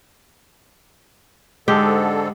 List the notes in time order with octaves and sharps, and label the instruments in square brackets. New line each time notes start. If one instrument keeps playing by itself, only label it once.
[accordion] G#2 D3 A4 [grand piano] G#3 [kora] G4